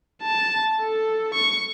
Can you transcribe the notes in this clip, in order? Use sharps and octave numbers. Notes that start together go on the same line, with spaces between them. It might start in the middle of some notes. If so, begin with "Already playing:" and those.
A5
A4
C#6